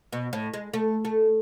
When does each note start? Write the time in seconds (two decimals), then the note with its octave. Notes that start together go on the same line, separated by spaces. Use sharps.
0.13 B2
0.33 A2
0.53 G#3
0.74 A3
1.05 A3